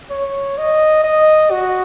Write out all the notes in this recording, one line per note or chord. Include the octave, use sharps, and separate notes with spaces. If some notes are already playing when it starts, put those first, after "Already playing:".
C#5
D#5
D#5
F#4